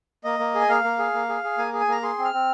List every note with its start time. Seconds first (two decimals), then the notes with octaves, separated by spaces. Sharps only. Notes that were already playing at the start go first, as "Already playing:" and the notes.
0.24 A#3 D#5
0.39 A#3
0.55 G#4
0.60 G#5
0.69 A#3 F5
0.84 A#3
0.99 G#4
1.14 A#3
1.29 G#4
1.44 G#4
1.58 A#3 G#5
1.73 G#4
1.81 G#5
1.88 A#3 A#5
2.03 G#4 C6
2.18 C4
2.25 F6
2.33 C4